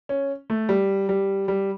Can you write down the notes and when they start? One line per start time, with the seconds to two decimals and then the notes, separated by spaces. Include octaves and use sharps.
0.09 C#4
0.50 A3
0.69 G3
1.09 G3
1.48 G3